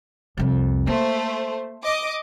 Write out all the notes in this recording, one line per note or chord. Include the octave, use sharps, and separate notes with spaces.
C2 F2
A3 A#3 C5
D#5 D6